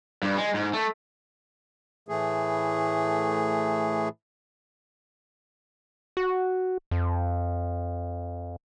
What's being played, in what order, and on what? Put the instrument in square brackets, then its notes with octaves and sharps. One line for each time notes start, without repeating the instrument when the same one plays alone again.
[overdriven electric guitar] G2
G#3
G#2
A3
[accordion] A2 E3 A3 G#4
[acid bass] F#4
F2